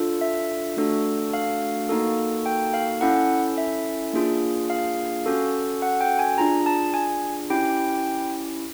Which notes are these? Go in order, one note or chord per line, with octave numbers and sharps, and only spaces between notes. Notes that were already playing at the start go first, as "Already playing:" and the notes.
Already playing: D4 F4 A4
E5
A3 D4 F#4 A4
F5
A#3 D#4 F#4 A4
G5
F5
C#4 E4 A4 F#5
E5
A#3 D4 F4 G#4
F5
C#4 F#4 A4
F#5
G5
G#5
D4 F4 G#4 A#5
A5
G#5
C#4 E4 G4 G5